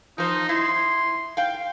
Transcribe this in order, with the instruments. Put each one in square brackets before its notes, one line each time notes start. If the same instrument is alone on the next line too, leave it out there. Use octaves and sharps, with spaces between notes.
[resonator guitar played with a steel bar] F3 C5 [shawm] D#4
[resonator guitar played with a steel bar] E4 [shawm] C6
[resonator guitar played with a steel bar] F5 G5